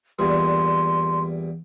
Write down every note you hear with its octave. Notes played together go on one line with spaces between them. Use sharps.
E2 A#2 G3 C6